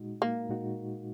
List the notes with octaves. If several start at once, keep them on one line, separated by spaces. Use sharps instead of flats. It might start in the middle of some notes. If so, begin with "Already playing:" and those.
Already playing: A#2 G#3 D#4 F#4
A#3
A#2 G#3 D#4 F#4